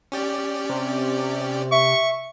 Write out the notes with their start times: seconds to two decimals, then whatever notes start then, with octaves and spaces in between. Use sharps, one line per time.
0.12 C#4 G4 D5
0.69 C3
1.71 E5 C#6